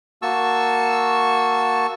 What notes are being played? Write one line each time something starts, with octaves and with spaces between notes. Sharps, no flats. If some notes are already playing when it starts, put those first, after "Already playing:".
A#3 F#4 A5 C#6 E6